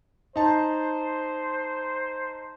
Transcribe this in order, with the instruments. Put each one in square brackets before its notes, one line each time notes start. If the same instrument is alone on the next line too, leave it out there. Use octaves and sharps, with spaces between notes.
[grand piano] D#4 A5 [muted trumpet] C5